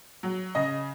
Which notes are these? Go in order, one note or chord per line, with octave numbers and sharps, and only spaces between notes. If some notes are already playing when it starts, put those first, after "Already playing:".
F#3
C#3 D#5